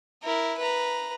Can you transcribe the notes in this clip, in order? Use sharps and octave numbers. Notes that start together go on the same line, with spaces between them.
E4 A#4
B4 A#5